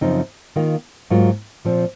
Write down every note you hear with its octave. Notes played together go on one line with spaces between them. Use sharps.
F#2 C#3 F3 C4 D#4
D#3 A#3 F4
G#2 F#3 A#3 F4
A#2 F3 C4